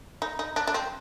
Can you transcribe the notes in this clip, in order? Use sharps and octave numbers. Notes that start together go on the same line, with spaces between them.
D#4
D#4
D4
D4
C4